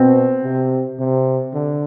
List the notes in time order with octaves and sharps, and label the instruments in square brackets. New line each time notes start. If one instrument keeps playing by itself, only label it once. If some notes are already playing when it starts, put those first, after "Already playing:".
Already playing: [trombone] B2 [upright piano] C4
[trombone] C3
C3
D3